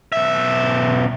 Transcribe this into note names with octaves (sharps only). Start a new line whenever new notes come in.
B1 E5